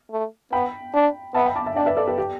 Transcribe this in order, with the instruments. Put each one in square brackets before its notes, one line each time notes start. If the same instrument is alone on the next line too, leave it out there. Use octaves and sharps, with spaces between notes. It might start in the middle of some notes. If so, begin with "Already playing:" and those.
[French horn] A3
[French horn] B3 [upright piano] G5 B5
[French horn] D4
[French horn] B3 [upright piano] E5 A5
[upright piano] G5 B5
A5 D6
E5 A5
[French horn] D4 [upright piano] D5 G5
[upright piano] B4 E5
A4 D5
G4 B4
G4